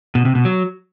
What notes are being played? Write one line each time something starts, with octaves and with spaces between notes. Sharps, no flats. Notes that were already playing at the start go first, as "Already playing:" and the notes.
B2
C3
B2
F#3